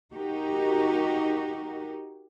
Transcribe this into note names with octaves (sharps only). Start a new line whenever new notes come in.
D#4 F#4 G4 A#4